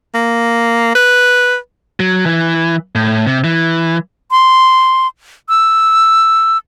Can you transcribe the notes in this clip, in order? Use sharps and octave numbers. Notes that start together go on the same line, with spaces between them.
A#3
B4
F#3
E3
A2
C3
E3
C6
E6